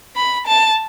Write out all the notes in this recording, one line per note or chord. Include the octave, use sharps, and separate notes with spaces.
B5
A5